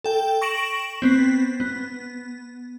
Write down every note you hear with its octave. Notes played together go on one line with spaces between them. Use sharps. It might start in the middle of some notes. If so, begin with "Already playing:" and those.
A4 G5
C#6 A#6 D7 E7 F#7
B3 C4
B3